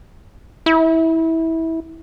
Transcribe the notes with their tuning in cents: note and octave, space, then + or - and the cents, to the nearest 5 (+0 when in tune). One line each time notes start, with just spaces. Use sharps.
E4 -20